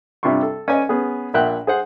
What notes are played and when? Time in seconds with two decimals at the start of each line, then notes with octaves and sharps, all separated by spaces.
0.23 G2 C3 G3 F4 C6 C#6
0.43 A4
0.68 C#4 B4 D5 D#5 G#5
0.89 B3 C#4 G#4
1.34 A#1 A#2 E5 F#5 G5 F#6
1.67 G#4 C5 F#5